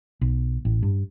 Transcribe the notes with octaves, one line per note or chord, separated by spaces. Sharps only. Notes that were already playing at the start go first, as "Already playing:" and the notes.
B1
A1
G2